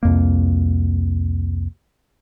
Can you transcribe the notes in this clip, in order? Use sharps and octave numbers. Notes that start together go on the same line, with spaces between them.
C2 F2 A#3